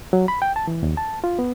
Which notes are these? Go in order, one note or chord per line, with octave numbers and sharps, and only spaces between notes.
F#3
B5
G5
A5
E3
D#2
A5
F4
B3